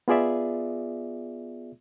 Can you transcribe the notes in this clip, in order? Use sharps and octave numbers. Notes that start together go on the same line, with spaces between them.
B3 F4 G#4 D5 E5